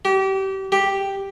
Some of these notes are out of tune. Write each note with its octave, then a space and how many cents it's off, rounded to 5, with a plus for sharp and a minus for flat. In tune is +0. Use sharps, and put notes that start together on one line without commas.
G4 -30
G4 +0